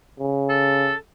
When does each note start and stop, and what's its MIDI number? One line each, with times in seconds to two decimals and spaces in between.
0.20 0.93 49
0.49 0.95 69